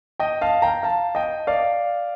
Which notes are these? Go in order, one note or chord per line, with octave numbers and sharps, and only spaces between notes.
D#5 G5
F5 A5
G5 A#5
F5 A5
D#5 G5
D5 F5